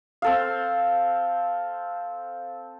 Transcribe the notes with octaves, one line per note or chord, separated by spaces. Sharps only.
C4 A4 F5